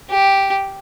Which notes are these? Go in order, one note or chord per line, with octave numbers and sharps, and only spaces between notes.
G4